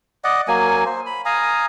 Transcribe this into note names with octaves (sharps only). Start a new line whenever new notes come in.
D5 D#5 F#5
F#3 A#3 G#5
C5
B5
F5 G#5 A#5 D#6